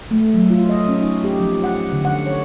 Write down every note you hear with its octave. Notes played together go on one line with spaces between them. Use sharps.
A3
F#3
F4
D#5
C#4
D#4
G4
F3
F#5
D3
F#5
C#5